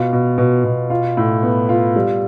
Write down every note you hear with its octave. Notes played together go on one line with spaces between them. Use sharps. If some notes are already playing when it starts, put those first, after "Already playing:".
Already playing: B2 F4
B2
B2
B2
F4
A2
B3
F4
G3